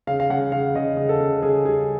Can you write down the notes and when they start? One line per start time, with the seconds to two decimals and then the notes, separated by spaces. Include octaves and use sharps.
0.07 C#3 F5
0.20 F5
0.30 C#3 F#5
0.52 C#3 F5
0.75 C#3 D#5
0.97 C#3
1.09 A4
1.21 C#3
1.42 C#3 G#4
1.65 G3 G#4